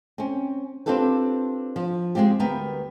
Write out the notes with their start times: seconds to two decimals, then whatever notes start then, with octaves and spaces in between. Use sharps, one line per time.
0.18 C4 C#4
0.86 C4 D4 F4 G4 A4 B4
1.76 F3
2.15 G#3 A3 C4 F4 G4
2.39 D2 G3 B3 A#4 B4 G5